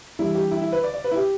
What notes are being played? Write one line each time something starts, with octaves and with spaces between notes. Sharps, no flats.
E3 G3 D4 E4
G4
E4
E4
B4
D5
D5
B4
E4
G4